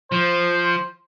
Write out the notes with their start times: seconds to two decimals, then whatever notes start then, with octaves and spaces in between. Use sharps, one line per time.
0.12 F3 C5